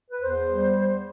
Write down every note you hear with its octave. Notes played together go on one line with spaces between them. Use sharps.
B4
E2 C5
G3